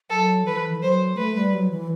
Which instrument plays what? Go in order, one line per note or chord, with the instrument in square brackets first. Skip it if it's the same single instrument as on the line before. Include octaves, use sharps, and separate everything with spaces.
[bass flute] F#3 [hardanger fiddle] A4
[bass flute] E3 [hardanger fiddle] B4
[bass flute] E3
[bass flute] F#3 [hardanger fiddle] C5
[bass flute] A3 [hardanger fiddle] B4
[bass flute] G3
F#3
E3